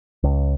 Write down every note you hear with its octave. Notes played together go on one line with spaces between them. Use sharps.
C#2